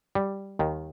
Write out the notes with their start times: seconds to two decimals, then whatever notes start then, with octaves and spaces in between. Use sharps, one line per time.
0.15 G3
0.59 D#2 D#3